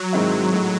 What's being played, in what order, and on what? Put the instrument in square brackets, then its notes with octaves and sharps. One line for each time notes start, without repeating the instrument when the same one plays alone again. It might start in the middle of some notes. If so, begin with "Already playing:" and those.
Already playing: [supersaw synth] F#3
[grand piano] G#2 D#3 G#3 C4 E4
A2 G#3 D#4